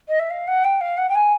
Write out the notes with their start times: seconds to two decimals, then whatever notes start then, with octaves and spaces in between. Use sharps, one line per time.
0.08 D#5
0.19 E5
0.30 F5
0.47 F#5
0.64 G5
0.80 F5
0.97 F#5
1.09 G5
1.15 G#5